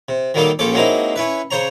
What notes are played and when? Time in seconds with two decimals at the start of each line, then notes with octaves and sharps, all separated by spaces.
0.09 C3
0.34 D#3 F#3 G3 A#3 D#4 A4
0.59 A#1 F3 C#4 A4 D6
0.74 F#3 G#3 A#3 C4 D#4 E4
1.16 C#4 E4 B4
1.51 C#3 C5 C#5 A#5